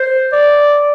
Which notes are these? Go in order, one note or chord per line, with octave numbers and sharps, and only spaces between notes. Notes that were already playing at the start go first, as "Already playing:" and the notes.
Already playing: C5
D5